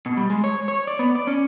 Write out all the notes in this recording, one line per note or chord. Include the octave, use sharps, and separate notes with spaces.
B2
G3
G#3
C#5
C#5
D5
B3
D5
C#4